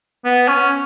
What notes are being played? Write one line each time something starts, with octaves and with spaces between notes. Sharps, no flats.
B3
C#4